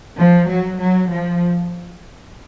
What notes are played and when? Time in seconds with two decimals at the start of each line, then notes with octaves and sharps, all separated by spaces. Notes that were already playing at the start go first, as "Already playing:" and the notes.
0.17 F3
0.49 F#3
0.79 F#3
1.09 F3